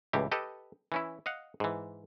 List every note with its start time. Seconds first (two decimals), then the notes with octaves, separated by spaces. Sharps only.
0.13 C#2 A2 E3 G4
0.32 G4 A4 B4 D#5
0.92 E3 C#4 E4
1.26 D#5 F5 F#5
1.60 G#2 E3